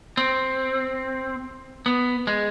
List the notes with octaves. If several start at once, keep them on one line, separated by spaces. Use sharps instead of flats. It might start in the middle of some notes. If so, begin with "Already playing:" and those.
C4
B3
G#3